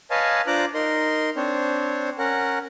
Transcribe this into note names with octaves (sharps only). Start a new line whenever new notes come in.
B4 C#5 D#5 F5 G#5 A5
D4 F4 C5 A#5 D6 F#6
D#4 A#4 C6
C4 D4 C5 C#5
C#4 A#4 F#5